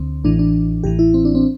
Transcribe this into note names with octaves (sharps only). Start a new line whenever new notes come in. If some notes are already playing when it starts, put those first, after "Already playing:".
Already playing: D2 D3 C4
A1 A2 E3 D4
D4
A1 A2 E3 G4
E4
C4
D4
C4